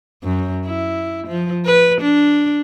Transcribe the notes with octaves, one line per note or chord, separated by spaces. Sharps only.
F#2
E4
F3
B4
D4